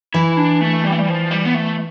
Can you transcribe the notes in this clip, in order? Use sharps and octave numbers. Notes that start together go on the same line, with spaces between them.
E3 E4
D4
A3
G3
A3
G3
F3
G3
B3
A3